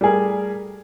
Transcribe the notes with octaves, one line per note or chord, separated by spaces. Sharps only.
G3 A3 G#4 A#4